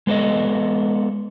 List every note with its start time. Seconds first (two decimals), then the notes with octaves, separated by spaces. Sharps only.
0.07 G#3 B3 A4 D#5